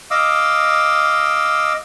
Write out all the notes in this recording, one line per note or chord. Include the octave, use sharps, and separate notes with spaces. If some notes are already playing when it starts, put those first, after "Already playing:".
D#5 F5 D6 E6